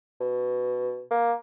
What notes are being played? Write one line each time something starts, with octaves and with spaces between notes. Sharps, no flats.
B2
A#3